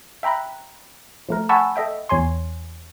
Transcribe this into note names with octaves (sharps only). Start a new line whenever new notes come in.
E5 G5 A#5 B5 F#6
F3 A3 A#4
F#5 G#5 A5 B5 C#6 E6
A4 D#5 E5 G5
E2 C#5 G#5 C6